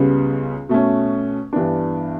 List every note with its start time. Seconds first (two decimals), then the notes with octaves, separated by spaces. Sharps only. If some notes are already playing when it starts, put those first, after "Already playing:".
Already playing: C#2 C#3 G3 B3
0.69 B2 A3 C#4
1.53 G2 E3 B3 D4